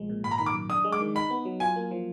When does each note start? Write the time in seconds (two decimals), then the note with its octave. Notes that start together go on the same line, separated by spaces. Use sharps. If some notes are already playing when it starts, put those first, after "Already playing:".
Already playing: B1 F3 G#3
0.09 A#2
0.24 G#1 B5
0.31 A#5
0.38 D#3 B5
0.46 D6
0.54 F#2
0.69 D4 D#6
0.84 G#3
0.93 D6
1.00 D#3
1.15 D#4 B5
1.30 B3
1.45 F#3
1.60 F4 G#5
1.76 A#3
1.91 F3